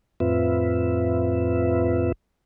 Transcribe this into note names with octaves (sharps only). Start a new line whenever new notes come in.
F2 A2 C4 F4 B4 E5